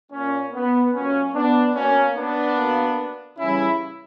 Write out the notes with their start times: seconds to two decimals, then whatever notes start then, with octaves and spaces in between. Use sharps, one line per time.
0.12 A#2 A#3 C#4
0.53 B3
0.93 A#2 F#3 A#3 C#4
1.34 B3 D4
1.75 B2 A#3 C#4
2.16 B3 D4
2.56 B2 A#3
3.38 C#3 E3 G3 C#4 E4